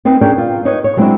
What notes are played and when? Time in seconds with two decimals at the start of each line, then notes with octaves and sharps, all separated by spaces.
0.05 B3 C4 D#4 B4
0.21 C#4 D4 G#4 A#4 D5 G5
0.38 F4
0.65 D#4 B4 C#5 D#5
0.84 C#5
0.97 F#3 G#3 C4 D4 E4